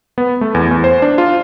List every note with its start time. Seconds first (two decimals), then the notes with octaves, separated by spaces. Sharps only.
0.18 B3
0.41 A3
0.54 E2
0.71 E2
0.84 C5
1.02 D4
1.18 F4